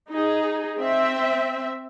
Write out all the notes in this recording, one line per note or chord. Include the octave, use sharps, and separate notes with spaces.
D#4 G#4
C4 E5